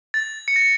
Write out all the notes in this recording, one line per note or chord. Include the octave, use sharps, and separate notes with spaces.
A6
C#7
A#6